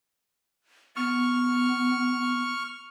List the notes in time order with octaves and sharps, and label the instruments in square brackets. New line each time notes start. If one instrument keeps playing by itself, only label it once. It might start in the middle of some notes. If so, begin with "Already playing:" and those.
[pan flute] B3 [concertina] C#6 F6